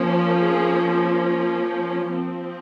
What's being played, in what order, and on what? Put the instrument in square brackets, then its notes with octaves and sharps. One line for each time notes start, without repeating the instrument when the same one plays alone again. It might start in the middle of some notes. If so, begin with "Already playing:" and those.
Already playing: [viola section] F3 A#3 C#4
G#4
F3 C4